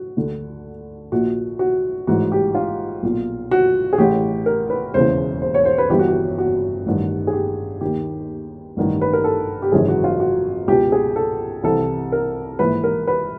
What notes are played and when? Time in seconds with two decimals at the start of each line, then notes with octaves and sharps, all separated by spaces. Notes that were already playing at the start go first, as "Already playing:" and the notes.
Already playing: F#4
0.17 D2 D3
1.12 A#1 A#2 F#4
1.59 F#4
2.07 A1 G#2 E3 F#4
2.32 G4
2.55 F4
3.03 B1 A#2
3.51 F#4
3.93 G#4
3.98 A1 A2 E3 G4
4.46 A#4
4.70 B4
4.94 E1 D#2 C#3 E3 C5
5.42 C5
5.54 C#5
5.65 C5
5.78 B4
5.90 G1 G2 E3 G4
5.99 F#4
6.08 G4
6.38 F#4
6.86 A1 G2 D#3
7.27 G#4
7.33 G4
7.81 D#2 D#3 G4
8.77 A1 G2 D#3
9.01 B4
9.13 A#4
9.24 A4
9.62 G4
9.72 G#1 F#2 C#3 E3 G#4
9.88 F#4
10.04 F4
10.20 F#4
10.68 C#2 B2 G4
10.92 G#4
11.16 A4
11.63 C2 C3 E3 A4
12.12 A#4
12.59 A#1 G#2 E3 B4
12.84 A#4
13.07 B4